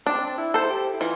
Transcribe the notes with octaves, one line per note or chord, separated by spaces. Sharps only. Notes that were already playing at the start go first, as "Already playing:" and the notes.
C4 D4
E4
A4 C5
G4
E4
E3 F4